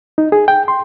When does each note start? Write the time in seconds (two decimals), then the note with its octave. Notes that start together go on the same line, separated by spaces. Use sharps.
0.18 D#4
0.32 G#4
0.48 G5
0.68 C6